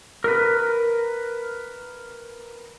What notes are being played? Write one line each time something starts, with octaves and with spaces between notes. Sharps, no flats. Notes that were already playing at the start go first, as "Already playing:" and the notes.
A#4 B4